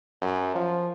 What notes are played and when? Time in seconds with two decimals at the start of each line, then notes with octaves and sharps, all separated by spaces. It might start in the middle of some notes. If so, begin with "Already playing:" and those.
0.21 F#2
0.55 F3